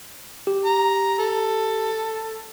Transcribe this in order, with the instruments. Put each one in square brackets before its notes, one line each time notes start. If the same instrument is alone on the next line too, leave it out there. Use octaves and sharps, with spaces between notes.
[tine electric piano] G4
[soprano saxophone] A#5
A4